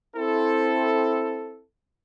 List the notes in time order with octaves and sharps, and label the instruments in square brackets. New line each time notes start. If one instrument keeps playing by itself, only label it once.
[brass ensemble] C4 E4 A4